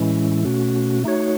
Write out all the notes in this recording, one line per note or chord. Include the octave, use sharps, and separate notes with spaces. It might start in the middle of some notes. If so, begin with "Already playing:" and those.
Already playing: A2 E3 G#3 C#4 E4
B2 A3 C#4 F#4
A3 D#4 F#4 C#5